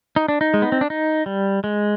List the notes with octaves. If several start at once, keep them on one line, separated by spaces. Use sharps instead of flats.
D#4
D4
D#4
G#3
B3
C4
D4
D#4
G3
G#3